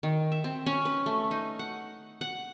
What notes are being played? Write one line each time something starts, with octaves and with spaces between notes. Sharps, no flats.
D#3
E5
C4
C#4
B4
A3
D#4
F#5
F#5